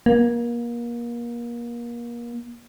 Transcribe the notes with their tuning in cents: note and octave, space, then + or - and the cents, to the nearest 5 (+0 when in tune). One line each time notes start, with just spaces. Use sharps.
A#3 +30